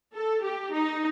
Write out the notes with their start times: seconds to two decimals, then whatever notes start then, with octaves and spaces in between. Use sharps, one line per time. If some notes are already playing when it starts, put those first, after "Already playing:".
0.14 A4
0.43 G4
0.74 D#4